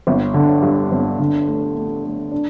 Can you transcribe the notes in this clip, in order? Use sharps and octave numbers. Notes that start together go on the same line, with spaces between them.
G1
D3
G2
G1
D3
A3
A3
A3
D4